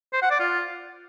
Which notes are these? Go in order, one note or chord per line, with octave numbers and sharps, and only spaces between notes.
C5
F#5
D5
F4